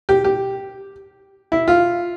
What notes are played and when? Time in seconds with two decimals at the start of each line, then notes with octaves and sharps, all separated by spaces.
0.09 G4
0.24 G4
1.52 E4
1.68 F4